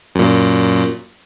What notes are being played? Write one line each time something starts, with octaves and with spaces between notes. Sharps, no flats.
F#2 A#2